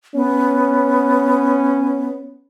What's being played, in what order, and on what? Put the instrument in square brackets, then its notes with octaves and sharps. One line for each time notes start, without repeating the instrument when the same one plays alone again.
[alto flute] B3 [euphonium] C#4